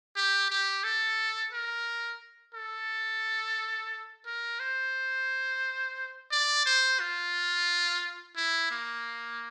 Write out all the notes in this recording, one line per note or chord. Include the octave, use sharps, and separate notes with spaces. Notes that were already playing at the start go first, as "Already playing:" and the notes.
G4
G4
A4
A#4
A4
A#4
C5
D5
C5
F4
E4
A#3